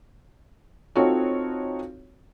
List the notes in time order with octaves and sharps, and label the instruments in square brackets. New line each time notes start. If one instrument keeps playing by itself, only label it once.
[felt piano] C4 D#4 F4 F#4 A4 C#5